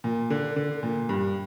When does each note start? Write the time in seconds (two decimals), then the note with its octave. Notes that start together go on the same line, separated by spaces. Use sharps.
0.04 A#2
0.30 D3
0.56 D3
0.83 A#2
1.09 G2